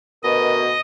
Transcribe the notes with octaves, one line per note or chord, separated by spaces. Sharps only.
D2 B2 A#4 D#5